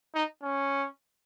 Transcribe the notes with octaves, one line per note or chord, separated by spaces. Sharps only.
D#4
C#4